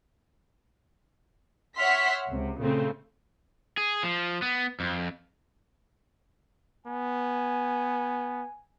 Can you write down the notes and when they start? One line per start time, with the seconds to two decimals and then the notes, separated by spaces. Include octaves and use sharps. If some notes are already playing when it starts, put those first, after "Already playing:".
1.77 C#5 E5 F#5 C6 F6 B6
2.29 C#2 C3
2.60 A#2 C#3 A3 C4
3.77 G#4
4.03 F3
4.42 B3
4.80 F2
6.87 B3 G#5